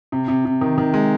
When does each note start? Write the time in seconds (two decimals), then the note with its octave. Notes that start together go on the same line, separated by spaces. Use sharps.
0.12 C3
0.28 C3
0.45 C3
0.61 D#3
0.78 D#3
0.94 G#3